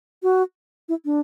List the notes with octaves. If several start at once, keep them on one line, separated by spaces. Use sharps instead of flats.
F#4
E4
D4